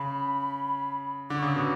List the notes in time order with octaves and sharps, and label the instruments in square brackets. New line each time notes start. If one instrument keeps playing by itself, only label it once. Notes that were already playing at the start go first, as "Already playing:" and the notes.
Already playing: [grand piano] C#3 [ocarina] B5
[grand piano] D3 [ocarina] D6
[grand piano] C#3 [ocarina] C#6
[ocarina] E6
[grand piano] B2 [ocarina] D6